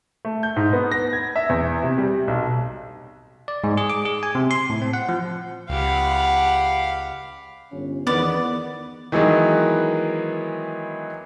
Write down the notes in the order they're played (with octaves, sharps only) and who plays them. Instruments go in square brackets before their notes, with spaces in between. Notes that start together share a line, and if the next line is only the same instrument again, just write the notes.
[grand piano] A3
G6
G#2
B3
A#6
G#6
E5
E2
C3
G3
B1
[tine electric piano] D5
G#2
G#4
D6
G#4
G#5
C3
C6
A2
C4
F#5
F3
[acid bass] C#2 [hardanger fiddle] G4 F#5 [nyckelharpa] F5 B5
[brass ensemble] G1 C#4
[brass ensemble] E2 D#3 [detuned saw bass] B3 [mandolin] D5
[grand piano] D#3 E3 F#3 G#3 B3